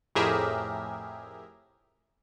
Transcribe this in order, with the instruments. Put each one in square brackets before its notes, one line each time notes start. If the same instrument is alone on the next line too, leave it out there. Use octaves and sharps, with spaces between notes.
[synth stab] F2 A2 G4 G#4 A#4 E5